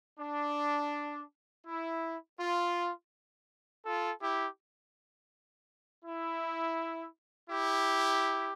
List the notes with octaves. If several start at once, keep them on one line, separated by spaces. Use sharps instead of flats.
D4
E4
F4
F4 A4
E4 G4
E4
E4 G4